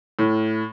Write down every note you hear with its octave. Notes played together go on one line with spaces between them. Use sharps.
A2